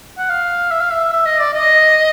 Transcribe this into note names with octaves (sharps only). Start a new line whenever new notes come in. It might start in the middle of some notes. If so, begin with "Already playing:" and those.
F#5
F5
E5
F5
E5
E5
D#5
D5
D#5